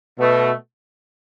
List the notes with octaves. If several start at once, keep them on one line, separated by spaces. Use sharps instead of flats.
B2 A3